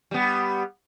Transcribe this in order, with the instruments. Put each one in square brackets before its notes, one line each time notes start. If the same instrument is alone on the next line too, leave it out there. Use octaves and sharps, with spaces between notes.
[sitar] G3 B3